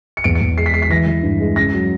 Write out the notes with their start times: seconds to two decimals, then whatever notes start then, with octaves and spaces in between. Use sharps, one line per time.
0.17 C#7
0.24 E2 D7
0.35 C#7
0.41 E2
0.57 G#3 C7
0.66 B6
0.73 G#3 C7
0.82 B6
0.90 E3 A#6
1.06 E3
1.23 G2
1.40 G#3
1.56 C#3 A#6
1.73 F#3